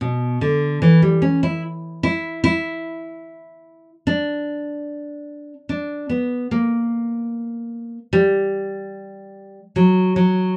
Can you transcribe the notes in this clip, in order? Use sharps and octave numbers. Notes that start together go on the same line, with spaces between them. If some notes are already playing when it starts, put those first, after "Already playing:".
B2
D3
E3
G3
C#4
E4
E4
E4
D4
D4
B3
A#3
G3
F#3
F#3